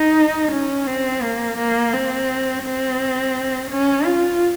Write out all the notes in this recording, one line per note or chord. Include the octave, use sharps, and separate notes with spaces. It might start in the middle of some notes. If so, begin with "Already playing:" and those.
Already playing: D#4
C#4
C4
A#3
A#3
C4
C4
C#4
F4